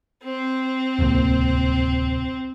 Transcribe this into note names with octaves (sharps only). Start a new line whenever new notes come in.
C4
D1 C2 A#3